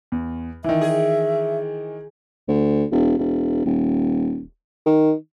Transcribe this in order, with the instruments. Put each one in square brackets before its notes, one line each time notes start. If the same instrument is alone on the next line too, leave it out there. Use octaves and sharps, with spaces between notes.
[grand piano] E2
[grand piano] D#3 E3 [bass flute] E5
[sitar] G#4
[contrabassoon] D2
E1
E1
D#1
D#3